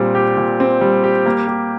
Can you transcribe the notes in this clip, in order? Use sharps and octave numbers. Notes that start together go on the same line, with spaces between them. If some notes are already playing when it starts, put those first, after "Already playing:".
Already playing: A#2 G3 C4
G4
A#2
C4
G3
G4
A#3
G4